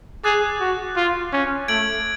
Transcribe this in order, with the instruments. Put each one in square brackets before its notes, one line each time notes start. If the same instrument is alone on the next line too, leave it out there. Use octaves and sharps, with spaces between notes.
[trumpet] G#4 [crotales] D6 F#6 A6
[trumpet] F#4
F4
C#4
[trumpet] A3 [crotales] G#6 D7 F#7